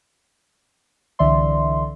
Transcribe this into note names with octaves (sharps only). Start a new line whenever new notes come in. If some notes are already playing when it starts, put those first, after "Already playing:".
C2 D3 E3 D5 E5 C6